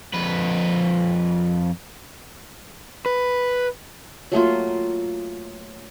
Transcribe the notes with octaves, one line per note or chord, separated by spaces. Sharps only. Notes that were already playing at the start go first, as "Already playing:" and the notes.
F2 B4
B4
F#3 A3 A#3 F4